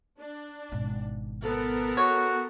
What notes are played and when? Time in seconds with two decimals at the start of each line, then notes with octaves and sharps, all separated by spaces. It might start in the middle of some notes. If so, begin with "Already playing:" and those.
0.20 D4
0.72 G#1 B2
1.43 B3 A4 A#4
1.97 F#4 C#5